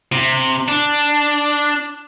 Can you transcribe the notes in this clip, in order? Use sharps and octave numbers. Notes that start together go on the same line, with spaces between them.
C3
D4